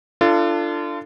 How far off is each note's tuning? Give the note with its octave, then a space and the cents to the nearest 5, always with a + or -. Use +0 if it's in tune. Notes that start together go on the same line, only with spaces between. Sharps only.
D4 +10 F4 -30 A4 +20